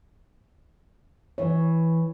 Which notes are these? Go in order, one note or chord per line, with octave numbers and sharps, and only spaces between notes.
E3 E4 C#5